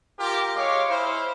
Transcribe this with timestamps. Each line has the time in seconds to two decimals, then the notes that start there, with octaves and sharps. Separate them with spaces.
0.18 F4 G4 A#4
0.54 G#3 C#5 F5 D6
0.88 E4 C5 F5